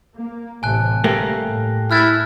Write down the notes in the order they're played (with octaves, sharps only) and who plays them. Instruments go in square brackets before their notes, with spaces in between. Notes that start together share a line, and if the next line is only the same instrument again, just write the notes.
[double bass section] A#3
[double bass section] A1 C3 [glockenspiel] G#5 A5 F#6
[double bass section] G1 [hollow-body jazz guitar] A3 A#3 G4
[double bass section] A2
[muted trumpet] E4 [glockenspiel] F6 F#6 A6